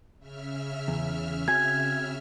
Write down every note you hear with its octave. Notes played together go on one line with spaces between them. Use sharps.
C#3 E5 F6
E2
C4 F#4 G#5 G#6